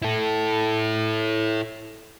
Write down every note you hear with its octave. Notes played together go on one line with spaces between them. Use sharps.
E4 A4